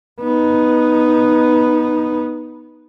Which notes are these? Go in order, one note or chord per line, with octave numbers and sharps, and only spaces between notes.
B3 D#4